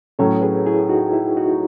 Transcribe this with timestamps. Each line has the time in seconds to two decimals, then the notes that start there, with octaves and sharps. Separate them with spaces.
0.19 A2 F#3 C#4 A4 C#5
0.42 G#4 B4
0.66 E4 G#4
0.89 D#4 F#4
1.13 E4
1.37 D#4 F#4